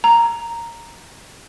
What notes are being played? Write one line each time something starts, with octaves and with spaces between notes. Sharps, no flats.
A#5